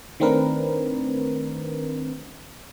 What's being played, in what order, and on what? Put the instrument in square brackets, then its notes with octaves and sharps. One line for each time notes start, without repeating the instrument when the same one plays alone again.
[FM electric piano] D#3 A3 C4 D4 A#4 B4